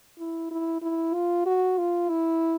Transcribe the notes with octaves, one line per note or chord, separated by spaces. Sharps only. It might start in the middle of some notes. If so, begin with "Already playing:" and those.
E4
E4
E4
F4
F#4
F4
E4